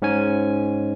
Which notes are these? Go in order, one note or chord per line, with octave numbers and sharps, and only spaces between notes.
G#2 C#4 G#5